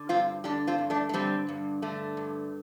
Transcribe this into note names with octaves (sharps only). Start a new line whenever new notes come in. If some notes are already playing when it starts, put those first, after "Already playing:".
Already playing: D3
G2 C4 F4
D3 D4 G4
C4 F4
G2
A3 D4
A3
D3 G3 C4
G2
D3 A3
G2